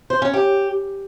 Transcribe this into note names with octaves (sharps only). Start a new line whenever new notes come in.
C5
C#4
G4